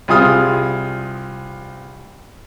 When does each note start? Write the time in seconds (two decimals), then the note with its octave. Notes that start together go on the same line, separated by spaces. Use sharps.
0.08 C2 F4 G#4 D#6 F6